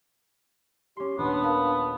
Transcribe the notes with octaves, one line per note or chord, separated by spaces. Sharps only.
C#4 G4 C6
D#1 B3 D4
A#4 F5 A5